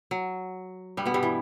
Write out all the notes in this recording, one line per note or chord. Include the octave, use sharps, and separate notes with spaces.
F#3
G2 G3
B2 B3
G2 G3
E3